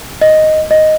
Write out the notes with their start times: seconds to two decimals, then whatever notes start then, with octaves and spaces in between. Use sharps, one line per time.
0.21 D#5
0.71 D#5